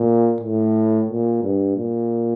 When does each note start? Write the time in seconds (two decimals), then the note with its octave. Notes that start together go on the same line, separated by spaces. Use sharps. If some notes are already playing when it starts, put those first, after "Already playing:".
Already playing: A#2
0.41 A2
1.09 A#2
1.43 G2
1.77 A#2